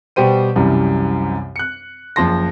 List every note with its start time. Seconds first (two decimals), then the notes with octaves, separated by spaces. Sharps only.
0.16 B2 G3 G4 C5 D#7
0.56 C2 F#2 C3 E3 G3
1.56 F#6 C#7
2.16 F#1 F3 A5 C6 A#6